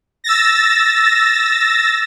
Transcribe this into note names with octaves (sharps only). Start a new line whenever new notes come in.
E6 A6 A#6